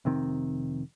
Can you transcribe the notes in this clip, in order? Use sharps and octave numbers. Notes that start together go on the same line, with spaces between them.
F1 C3 D#3 C4